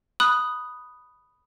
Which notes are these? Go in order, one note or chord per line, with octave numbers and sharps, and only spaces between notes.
B5 D#6 F#6